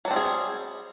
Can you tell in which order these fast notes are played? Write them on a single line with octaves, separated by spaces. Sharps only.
F#3 D4 C4 G3 G#4